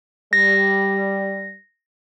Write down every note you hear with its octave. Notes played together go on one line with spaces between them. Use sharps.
G3 A#6